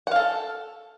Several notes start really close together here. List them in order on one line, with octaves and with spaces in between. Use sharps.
F#5 F5 A4